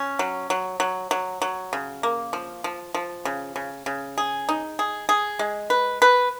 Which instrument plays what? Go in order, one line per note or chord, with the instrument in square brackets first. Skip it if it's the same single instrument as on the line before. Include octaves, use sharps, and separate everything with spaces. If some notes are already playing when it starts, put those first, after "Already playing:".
Already playing: [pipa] C#4
F#3
F#3
F#3
F#3
F#3
C#3
A#3
F3
F3
F3
C#3
C#3
C#3
G#4
D#4
G#4
G#4
G#3
B4
B4